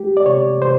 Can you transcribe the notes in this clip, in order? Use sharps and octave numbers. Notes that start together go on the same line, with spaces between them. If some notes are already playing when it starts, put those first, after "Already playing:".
Already playing: G#3 G4
D5
C3 C#5
C3 C5